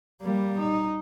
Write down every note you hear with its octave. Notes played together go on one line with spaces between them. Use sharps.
G3 A#3
D#4